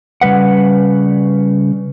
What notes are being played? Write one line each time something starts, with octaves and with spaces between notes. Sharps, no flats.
C#3 G3 B4 F#5